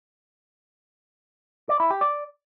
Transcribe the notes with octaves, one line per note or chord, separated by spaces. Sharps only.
D5
E4
G4
D5